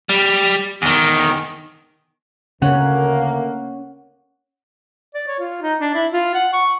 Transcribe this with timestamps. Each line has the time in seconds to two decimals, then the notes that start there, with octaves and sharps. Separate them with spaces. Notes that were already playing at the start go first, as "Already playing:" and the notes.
0.09 G3
0.82 E2 D#3
2.62 D2 C#3 A3 A#3 C#4 F#5
5.15 D5
5.28 C#5
5.39 F4
5.62 D#4
5.81 D4
5.95 E4
6.13 F4
6.34 F#5
6.53 C#6